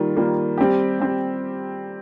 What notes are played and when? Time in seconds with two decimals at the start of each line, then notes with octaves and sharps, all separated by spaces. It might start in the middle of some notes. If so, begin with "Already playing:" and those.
Already playing: D#3 G3 A#3 F4
0.16 D#3 G3 A#3 F4
0.58 G3 C4 G4
1.00 G3 C4 G4